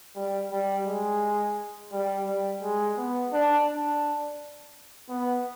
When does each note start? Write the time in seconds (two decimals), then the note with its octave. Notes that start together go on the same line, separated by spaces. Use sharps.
0.16 G3
0.51 G3
0.86 G#3
1.92 G3
2.27 G3
2.62 G#3
2.98 B3
3.33 D4
3.68 D4
5.09 B3